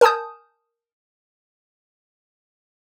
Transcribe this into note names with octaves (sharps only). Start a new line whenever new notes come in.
A#4 G#5 A5 D#6 G6